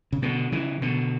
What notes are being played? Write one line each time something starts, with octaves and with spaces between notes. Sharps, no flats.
C#3
B2 D3
C#3 E3
B2 D3